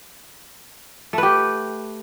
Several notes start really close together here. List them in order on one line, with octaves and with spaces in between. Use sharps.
A3 B4 G4